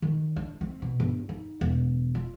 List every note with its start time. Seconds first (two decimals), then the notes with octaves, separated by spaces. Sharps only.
0.02 D#3
0.36 D4
0.61 C4
0.82 B2
1.00 G1
1.29 D#4
1.61 E1
2.15 F4